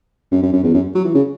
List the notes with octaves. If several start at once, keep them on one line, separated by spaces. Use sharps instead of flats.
F#2
F#2
F#2
E2
F#2
F#3
E3
C#3